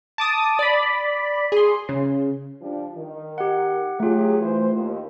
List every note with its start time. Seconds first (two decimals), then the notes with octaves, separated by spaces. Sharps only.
0.18 A5 D6 D#6
0.59 D5 B5
1.52 G#4 C6
1.89 C#3
2.61 F3 G3 D4
2.96 D#3
3.38 G4 F#5
4.00 F#3 A3 F4 G4 G#4
4.40 E3 C5
4.73 D#2